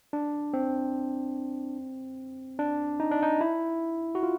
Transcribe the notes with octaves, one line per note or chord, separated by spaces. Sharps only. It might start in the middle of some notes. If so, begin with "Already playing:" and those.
D4
C4
D4
D#4
D4
D#4
E4
F#4
F4